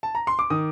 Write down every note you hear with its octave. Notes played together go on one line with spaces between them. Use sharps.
A5
A#5
C6
D6
D#3 D#6